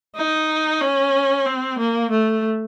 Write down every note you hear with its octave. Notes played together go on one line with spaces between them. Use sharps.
D#4
C#4
C4
A#3
A3